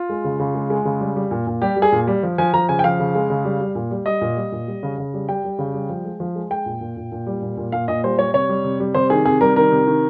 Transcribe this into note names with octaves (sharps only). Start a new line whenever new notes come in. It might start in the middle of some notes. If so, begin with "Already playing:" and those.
Already playing: F4
G#3
C#3
C#3
G#3
G#3
C#3
G3
G3
A#2
A#2
G3 G4
G3
G#4
A#2
G3
F3
F3 G#5
F3 A#5
C#3 G#5
G5
F3 F5
C#3
G#3
C#3
G3
G3
A#2
G3
G3 D#5
A#2
G3
A#2
G3
C#3
C#3
G3
G3 G5
G3
C#3
G3
F3
G#3
F3
G#3
G#3 G5
A#2
A#2
A#2
A#2
G3
A#2
A#2
A#2 F5
A#2 D#5
G3 C5
G3 C#5
C3 C#5
G3
C3
G3
C3 C5
D#3 G#4
C3 G#4
G3 A#4
D#3 A#4
C3
D#3